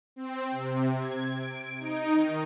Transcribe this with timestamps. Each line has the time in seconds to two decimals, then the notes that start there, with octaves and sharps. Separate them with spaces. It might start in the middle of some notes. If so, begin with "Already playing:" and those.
0.16 C4
0.51 C3
0.97 G#6
1.34 D7
1.80 D#4
2.14 D#3